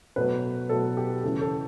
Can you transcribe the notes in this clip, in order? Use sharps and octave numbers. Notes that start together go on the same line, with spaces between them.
B2 F#3 A3 B4
B2 F#3 A3 A4
G4
C#3 E3 A3 A4
A4